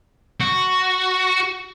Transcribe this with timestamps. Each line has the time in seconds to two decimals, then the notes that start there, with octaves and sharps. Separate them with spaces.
0.40 F#4